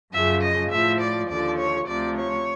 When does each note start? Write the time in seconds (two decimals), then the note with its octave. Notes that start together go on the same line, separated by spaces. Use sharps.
0.13 F#2 C#3 F3 E5
0.41 D#5
0.71 A2 F3 E5
1.00 D5
1.29 D#2 D3 F3 D5
1.58 C#5
1.87 D2 C3 F3 D5
2.16 C#5